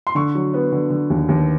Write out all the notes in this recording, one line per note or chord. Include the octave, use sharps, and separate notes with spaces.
C6
D3 C#6
F#3
B3
D3
D3
D#2
D#2